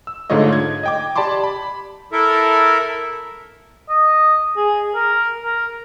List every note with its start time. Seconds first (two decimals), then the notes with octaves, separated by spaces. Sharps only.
0.07 E6
0.30 G#2 D3 A3 F4 C#5 D#5
0.53 G#6
0.83 D#5 G5 D6
1.16 G4 D5 A5 B5 C6 D6
1.44 B5
2.12 E4 A4 A#4 E5
3.89 D#5
4.56 G#4
4.95 A#4
5.43 A#4